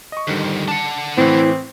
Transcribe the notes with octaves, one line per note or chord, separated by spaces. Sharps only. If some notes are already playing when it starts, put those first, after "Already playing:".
D#5 C#6
F2 G#2 D3 D#3 G3
D4 F#5 A5
A2 E3 C4 E4